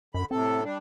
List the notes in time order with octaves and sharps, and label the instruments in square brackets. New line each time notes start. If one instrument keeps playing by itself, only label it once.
[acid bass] F#2 [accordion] D3 B5
[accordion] A2 C3 A4 [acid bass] C4
[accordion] G3 D4